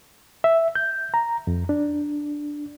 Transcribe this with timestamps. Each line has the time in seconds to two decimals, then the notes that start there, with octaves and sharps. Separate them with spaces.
0.44 E5
0.75 G6
1.14 A#5
1.47 F2
1.69 D4